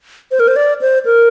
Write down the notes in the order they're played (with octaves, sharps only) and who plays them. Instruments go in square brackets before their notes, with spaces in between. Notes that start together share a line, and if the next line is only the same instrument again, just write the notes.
[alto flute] C5
A#4
C5
D5
C5
A#4